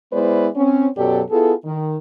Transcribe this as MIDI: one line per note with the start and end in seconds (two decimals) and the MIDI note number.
0.12 0.48 56
0.12 0.48 59
0.12 0.48 64
0.12 0.48 71
0.12 0.48 72
0.12 0.48 74
0.55 0.86 60
0.55 0.86 61
0.97 1.22 42
0.97 1.22 47
0.97 1.22 54
0.97 1.22 67
0.97 1.22 69
0.97 1.22 74
1.31 1.53 59
1.31 1.53 64
1.31 1.53 65
1.31 1.53 68
1.31 1.53 69
1.65 1.96 51